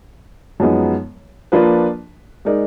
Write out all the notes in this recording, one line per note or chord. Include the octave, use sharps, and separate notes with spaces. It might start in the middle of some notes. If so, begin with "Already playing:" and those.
F#2 F3 G#3 B3 D#4
F3 A#3 D4 F4 B4
G#3 D#4 A#4 D5